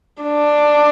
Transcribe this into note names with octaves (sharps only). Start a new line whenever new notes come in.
D4